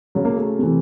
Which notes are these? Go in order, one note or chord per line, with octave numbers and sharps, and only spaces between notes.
C#3 F#3
A#3
A3
C3 E3